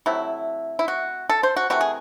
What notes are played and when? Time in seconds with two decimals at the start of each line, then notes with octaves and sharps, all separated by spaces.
0.06 C3 F#3 A3 E4
0.79 E4
0.88 F#4
1.30 A4
1.43 C5
1.56 F#4
1.70 C3 E3 A3 F#4
1.81 G#4